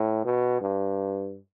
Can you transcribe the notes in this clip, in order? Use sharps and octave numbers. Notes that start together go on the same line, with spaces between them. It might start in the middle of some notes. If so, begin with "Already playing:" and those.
Already playing: A2
B2
G2